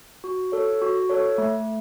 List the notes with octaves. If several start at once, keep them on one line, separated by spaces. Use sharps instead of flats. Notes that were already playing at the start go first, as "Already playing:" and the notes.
F#4
A4 C#5
F#4
A4 C#5
A3